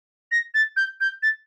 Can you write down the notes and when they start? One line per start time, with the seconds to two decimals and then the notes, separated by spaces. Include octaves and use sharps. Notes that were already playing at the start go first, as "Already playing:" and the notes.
0.32 A#6
0.54 A6
0.77 G6
1.01 G6
1.23 A6